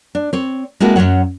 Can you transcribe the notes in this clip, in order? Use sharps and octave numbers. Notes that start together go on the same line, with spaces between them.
D4
C4 C#5
G#3 A#3 C4 E4 F#4 A4
F#2 C#3 F#3 C#5 F#5